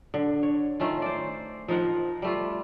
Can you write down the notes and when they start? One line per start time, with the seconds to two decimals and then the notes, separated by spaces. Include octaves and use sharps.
0.14 D3
0.43 C#5
0.80 D#3 A3 C#4 F4
1.02 C5 D5
1.68 F3 D#4 A#4 F#5
2.22 G3 A3 F4